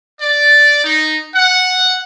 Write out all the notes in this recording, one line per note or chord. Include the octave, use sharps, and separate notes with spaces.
D5
D#4
F#5